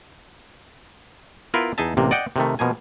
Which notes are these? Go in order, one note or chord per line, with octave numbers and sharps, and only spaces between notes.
B3 E4 F4 A#4 B4
E2 D#4 G#4 D#5 E5 A5
A1 C3 A#3
D5 D#5 F#5 G5
C3 D#3 A3
B2 F3 A#3 G#5